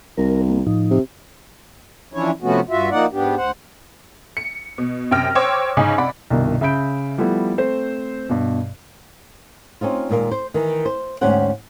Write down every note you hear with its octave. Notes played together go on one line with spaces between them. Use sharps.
C2 A#4
A#3
A2 F3 D#4
C3
E3 F3 C#4 D4 E4 C#5
C3 F3 A3 B3 C#4 F#4
G2 F4 F#4 E5
F3 A#3 D#4 D5 F#5
G#2 B3 D4 G4
D2 C5 F#5
C#7
B2
F#2 C3 G5 F6 A#6
C5 C#5 G5 D6 E6 G#6
G#2 C#3 G#3 C#4 D#4
C3 D5 F#5 B5
C2 G2 B2 D#3
C#3 E5 B5 G6 D7
F3 G3 A3 B3 E4
A3 C4 C5
G2 B2
C4 C#4 D#4 F4
D#2 A#2 G#3 A#3
C5
D#3 E3
C5
D2 G#2 C#4 G4 C5 F#5